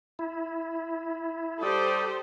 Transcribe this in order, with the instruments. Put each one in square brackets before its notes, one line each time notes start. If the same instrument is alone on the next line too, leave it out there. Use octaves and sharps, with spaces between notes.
[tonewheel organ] E4
[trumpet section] G3 D5 D#6 [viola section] G4 A4 C5